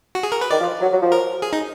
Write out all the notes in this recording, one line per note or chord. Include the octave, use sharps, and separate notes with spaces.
F#4
G#4
A#4
B4
D#3 D5
F3
F#3
F#3
F3
A#4
G#4
D#4